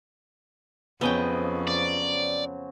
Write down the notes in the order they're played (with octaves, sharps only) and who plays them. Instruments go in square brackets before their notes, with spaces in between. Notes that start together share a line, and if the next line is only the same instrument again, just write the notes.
[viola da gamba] F2 [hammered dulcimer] C#3 F#3 C5 [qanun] B3 D#5 G5
[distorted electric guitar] D5